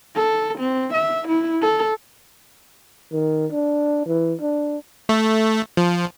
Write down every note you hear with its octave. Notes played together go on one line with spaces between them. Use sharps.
A4
C4
E5
E4
A4
D#3
D4
E3
D4
A3
F3